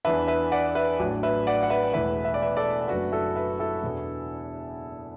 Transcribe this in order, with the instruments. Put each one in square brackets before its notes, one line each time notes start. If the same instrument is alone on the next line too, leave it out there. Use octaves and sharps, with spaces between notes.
[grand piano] E2 E3 D4 B4 E5
B4 E5
D5 F#5
B4 E5
A1 A2 F#3 D4
B4 E5
D5 F#5
F#5
B4 E5
E1 E2 E3 A3 B4 E5
E5
D5
B4 E5
A4 D5
D5
F#1 F#2 F#3 A3 D4 F#4 B4
E4 A4
B4 E5
E4 A4
E2 B2 B3 D4